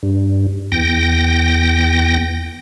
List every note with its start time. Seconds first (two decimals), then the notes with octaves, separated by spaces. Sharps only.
0.03 G2
0.72 E2 G5 A#6